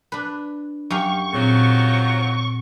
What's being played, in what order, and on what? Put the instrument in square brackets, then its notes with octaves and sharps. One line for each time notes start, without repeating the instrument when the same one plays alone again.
[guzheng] D4 B4
[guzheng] F#2 G4 F5 [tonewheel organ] C#6
[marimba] A#2 C4 G#4 [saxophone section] D#3 F3 F#3